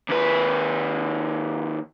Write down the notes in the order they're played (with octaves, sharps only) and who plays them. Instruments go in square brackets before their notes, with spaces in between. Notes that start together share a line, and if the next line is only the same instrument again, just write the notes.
[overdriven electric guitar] D#2 B4